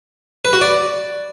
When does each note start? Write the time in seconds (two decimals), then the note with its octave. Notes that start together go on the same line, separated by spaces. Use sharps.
0.45 B4
0.53 F#4
0.61 D5